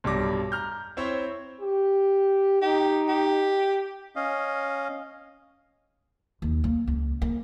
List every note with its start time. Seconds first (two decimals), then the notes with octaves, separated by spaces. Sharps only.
0.04 B1 G2 G3 D6 A#6
0.52 A#5 F6 G6
0.97 C4 E4 C5 C#5
1.61 G4
2.62 D#4 G4
3.08 G4
4.16 C#4 D#5 F5
6.42 D#2
6.64 A#3
6.87 C#2
7.22 A#3